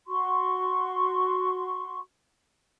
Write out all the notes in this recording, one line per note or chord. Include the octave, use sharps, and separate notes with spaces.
F#4 C6 C#6